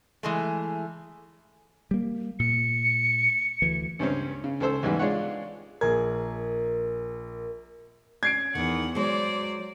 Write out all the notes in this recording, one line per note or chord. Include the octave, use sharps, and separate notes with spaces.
E3 G#3 A3
G3 A#3
A#2 C#7
D2 E3
C#2 G2 C4 C#4
C#3
C#2 A4 C5 E6
E2 G#2 E3 G3
G#3 D4 F4 C#5 F#5
A#1 G#4 A#4 G#6
C#4 G#6 C7 D7
E2 D#3 F#5
F#3 G#3 C5 D5